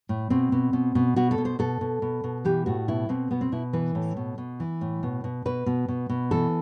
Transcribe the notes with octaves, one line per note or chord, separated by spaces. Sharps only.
A2
B2 C4
B2
B2
B2
B2 F#4
A4
B2
C5
B2 A4
B2
B2
B2
E3 G4
A2 F#4
B2 E4
B2 C4
B2 B3
C4
B2 E4
E3 B4
A2
B2
B2
E3
A2
B2
B2
B2 B4
B2
B2
B2
E3 A4